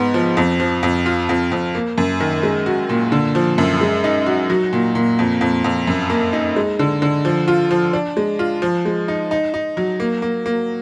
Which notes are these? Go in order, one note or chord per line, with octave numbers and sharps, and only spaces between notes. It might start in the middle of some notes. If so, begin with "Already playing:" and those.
Already playing: G#2 B3
F3
F2
F3
F2
F4
F2
F2
A#3
F#2
D#3
G#3
F#4
A#2
D3
F3
F#2
G#3
D#4
F#4
F#3
A#2
A#2
F2
F2
F2
F#2
A#3
D#4
G#3
D3
D3
F3
F4
F3
D4
G#3
F4
F3
G#3
D#4
D#4
D#4
F#3
A#3
A#3
A#3